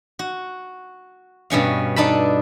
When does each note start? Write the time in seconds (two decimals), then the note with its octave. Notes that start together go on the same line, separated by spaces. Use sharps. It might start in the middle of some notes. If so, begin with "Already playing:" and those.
0.19 F#4
1.50 G2 B2 C#4 F5
1.96 D4 D#4 A4 A5 B5